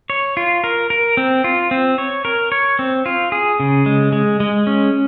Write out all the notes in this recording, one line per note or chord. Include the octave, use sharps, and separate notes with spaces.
C#5
F4
A#4
A#4
C4
F4
C4
C#5
A#4
C#5
C4
F4
G#4
C#3
G#3
G#3
G#3
C#4